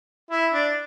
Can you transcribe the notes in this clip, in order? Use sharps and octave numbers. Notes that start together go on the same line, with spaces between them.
E4
D4